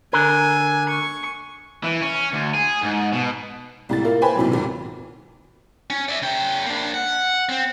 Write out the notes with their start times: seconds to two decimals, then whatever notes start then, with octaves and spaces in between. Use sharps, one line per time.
0.13 D3 A#4 G#5
0.89 C#6
1.84 E3
2.01 C#4
2.33 D2
2.54 G#4
2.83 G#2
3.13 B2
3.89 C2 A2 A6
4.04 A#3 E4 F4
4.22 B4 C5 G5 G#5 B5
4.36 B1 A2 C3 F#3
4.50 G#1 D#2 A#2
5.90 C#4
6.09 D5 E5
6.22 C#3 G5
6.66 A#3 D4
6.94 F#5
7.49 C4